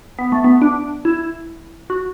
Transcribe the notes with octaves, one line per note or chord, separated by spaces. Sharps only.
B3
A3
B3
D4
E4
F#4